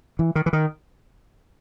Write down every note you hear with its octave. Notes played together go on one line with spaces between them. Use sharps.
E3
D#3
E3
D#3